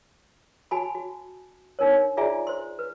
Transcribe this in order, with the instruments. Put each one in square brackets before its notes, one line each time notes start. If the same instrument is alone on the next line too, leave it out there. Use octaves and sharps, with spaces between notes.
[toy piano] F#4 G#5 A5 B5
F#4
D4 D#4 A#4 C#5
F4 G#4 D5 E5 G#5 A#5
C5 C6
B4